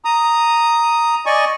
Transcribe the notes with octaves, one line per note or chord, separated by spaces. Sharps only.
A#5 D#6
D5 D#5 G#5 C#6